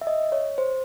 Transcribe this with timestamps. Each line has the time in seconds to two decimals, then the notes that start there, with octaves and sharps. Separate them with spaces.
0.01 E5
0.07 D#5
0.32 C#5
0.58 C5